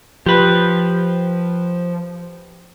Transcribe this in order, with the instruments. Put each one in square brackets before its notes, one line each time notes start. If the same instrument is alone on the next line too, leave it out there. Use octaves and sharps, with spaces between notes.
[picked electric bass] F3 [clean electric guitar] G4 B4